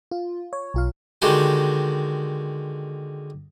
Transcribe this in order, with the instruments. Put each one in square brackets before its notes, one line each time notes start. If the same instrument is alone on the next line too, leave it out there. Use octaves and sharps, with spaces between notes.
[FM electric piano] F4
C#5
B1 F4 F5
[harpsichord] D3 D#3 G#3 F#4 G4